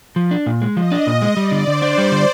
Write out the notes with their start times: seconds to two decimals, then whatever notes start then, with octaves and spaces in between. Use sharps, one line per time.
0.16 F3
0.31 D4
0.46 A#2
0.62 G#3
0.77 F3 D#5
0.92 D4
1.07 A#2
1.22 G#3
1.37 G3 D5
1.51 D3
1.67 D3 C5
1.82 D4
1.97 G3 C5
2.12 D3